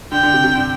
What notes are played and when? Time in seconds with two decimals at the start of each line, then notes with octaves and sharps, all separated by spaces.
0.12 D3 G5
0.23 D3
0.33 C3
0.44 C3
0.55 D3